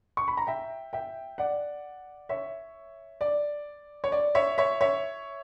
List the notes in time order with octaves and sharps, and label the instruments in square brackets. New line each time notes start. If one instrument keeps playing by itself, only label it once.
[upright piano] C#6
B5
A#5
E5 G5
E5 G5
D5 F#5
C#5 E5
D5
C#5
D5
C#5 E5
C#5 E5
C#5 E5